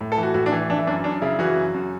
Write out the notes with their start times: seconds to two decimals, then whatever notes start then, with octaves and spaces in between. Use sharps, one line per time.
0.01 A2
0.12 A4
0.18 E3
0.23 F#4
0.34 A2 F#4
0.46 D4
0.52 E3
0.70 E3 D4
0.78 E4
0.87 F#2 D4
1.04 F#2 D4
1.22 C#3 E4
1.39 E3 F#4
1.56 F#2
1.74 F#2